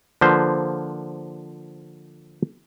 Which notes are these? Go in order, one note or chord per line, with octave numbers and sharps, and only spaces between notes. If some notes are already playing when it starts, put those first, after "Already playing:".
D3 F3 A#3 B4 C5